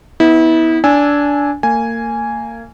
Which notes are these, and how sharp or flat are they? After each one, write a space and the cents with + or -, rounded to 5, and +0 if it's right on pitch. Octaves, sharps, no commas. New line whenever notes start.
B3 +0 E4 -30
D4 -15 G#5 +0 E6 -5
A#3 -30 G#5 +0